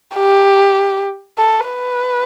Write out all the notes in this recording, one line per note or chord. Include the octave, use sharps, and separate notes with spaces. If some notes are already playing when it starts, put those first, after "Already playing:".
G4
A4
B4